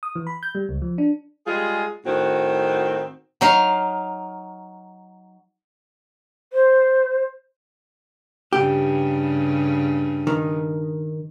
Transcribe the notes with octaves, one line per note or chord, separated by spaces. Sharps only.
D#6
E3
B5
G6
G3
C#2
F3
D4
G3 G#3 F4 G#4
A2 D#3 C4 F#4
F#3 D#4 F5
C5
G2 C#3 G4
D#3